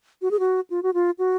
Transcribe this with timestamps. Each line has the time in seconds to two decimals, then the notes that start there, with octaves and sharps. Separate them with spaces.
0.22 F#4
0.31 G#4
0.39 F#4
0.70 F4
0.83 F#4
0.94 F4
1.19 F#4